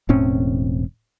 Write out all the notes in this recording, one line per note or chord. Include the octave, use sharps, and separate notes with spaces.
E1 A2 C4 C#4